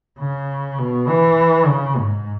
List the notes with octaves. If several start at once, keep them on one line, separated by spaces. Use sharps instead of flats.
C#3
B2
E3
C#3
G#2